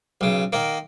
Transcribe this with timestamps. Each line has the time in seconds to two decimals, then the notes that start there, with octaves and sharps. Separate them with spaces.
0.21 B1 C#3
0.53 D#3 A#3